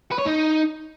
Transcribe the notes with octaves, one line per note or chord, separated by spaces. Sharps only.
B4
C#5
D#4